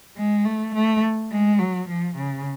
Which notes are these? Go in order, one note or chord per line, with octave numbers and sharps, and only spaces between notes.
G#3
A3
A3
G#3
F#3
F3
C#3